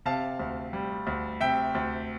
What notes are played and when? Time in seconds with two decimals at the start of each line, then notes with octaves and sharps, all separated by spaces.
0.06 C3 F5 A5
0.39 D2
0.73 G3
1.07 D2
1.41 C3 E5 G5
1.75 D2